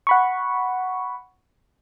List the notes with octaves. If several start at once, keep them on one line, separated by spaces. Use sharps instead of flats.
F#5 B5 C#6